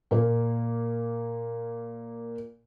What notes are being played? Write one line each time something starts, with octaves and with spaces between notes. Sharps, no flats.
A#2 A#3